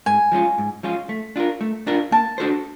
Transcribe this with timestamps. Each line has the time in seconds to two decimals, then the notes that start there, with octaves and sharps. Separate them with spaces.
0.06 G#2 G#5
0.32 F3 G#3 C#4 F4
0.58 G#2
0.83 F3 G#3 C#4 F4
1.09 A3
1.36 D4 F4 A#4
1.61 A3
1.87 D4 F4 A#4
2.12 A#3 A5
2.38 D4 F#4 A4 C5